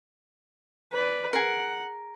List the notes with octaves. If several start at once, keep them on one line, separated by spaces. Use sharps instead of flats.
B4 D5
G#4 A#4 F#5